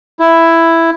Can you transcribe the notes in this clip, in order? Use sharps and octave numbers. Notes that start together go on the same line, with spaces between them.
E4